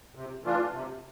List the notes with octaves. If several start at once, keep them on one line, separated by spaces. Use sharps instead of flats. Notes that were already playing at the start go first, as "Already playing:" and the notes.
C3
E3 A3 D4 F4
C3